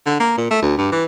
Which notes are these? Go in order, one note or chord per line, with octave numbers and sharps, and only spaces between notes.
D3
A#3
A#2
A3
D2
G2
E3